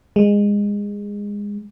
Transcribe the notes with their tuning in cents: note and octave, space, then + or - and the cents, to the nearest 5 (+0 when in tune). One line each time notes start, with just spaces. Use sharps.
G#3 -20